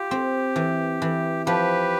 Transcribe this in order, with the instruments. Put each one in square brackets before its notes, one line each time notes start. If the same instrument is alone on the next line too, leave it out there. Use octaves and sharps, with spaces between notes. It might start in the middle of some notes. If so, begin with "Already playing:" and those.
Already playing: [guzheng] F4 [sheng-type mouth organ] G4
[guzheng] C4
E3
E3
[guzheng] F3 [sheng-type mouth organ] G4 B4